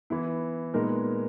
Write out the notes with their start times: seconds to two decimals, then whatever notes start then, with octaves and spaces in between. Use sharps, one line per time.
0.10 E3 B3 E4
0.74 A#2 G#3 B3 D#4 A#4